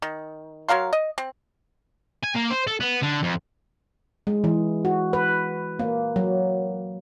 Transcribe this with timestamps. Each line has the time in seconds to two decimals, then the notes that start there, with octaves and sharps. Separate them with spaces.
0.02 D#3
0.69 F#3 A#4 F5 C6
0.93 D#5
1.18 C4
2.23 G#5
2.35 A#3
2.50 C5
2.67 A4
2.80 B3
3.03 D3
3.23 F2
4.27 G#3
4.44 E3
4.85 F#4
5.13 B4
5.79 A#3
6.16 F#3